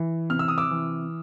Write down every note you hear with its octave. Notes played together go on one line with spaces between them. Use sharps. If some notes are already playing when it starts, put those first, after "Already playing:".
Already playing: E3
C3 F6
E6
D#6
D6 E6
E3